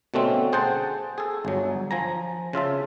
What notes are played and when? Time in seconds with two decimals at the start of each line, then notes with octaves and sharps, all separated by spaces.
0.14 B2 D3 A3 C4 C#4
0.53 G#4 C5 F#5 G5 A5
1.18 G#4 A4
1.45 G1 F#3
1.91 F3 G#5 A#5
2.53 C#3 F4 E5 A5